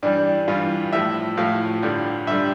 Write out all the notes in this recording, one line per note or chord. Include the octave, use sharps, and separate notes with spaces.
G2 E3 G3 D4
G2 E3 G3 F4
A2 F3 E5
A2 F3 F5
G2 D3 G3
G2 D3 G3 E5